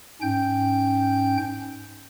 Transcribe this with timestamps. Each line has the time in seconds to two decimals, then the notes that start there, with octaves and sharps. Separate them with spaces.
0.21 G#2 C#4 G5 G6